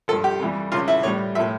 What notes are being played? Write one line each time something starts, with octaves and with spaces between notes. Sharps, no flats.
G2 F3 A4
G4
F2 E3 G3
C#2 C#3 F3 F4
E4
A2 G3 C#5
A2 F3 E5